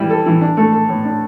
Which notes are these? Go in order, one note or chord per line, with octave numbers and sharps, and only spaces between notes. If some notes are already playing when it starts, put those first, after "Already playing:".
Already playing: E3 G3 E4
A4
E3
D4
A3
A4
A2
D4